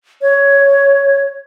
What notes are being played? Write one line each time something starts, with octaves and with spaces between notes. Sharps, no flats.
C#5